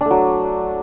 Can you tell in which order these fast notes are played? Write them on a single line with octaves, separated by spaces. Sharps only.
D4 A3 F#3